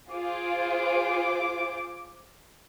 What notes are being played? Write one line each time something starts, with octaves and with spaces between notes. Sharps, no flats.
F4 G#4 C5 D6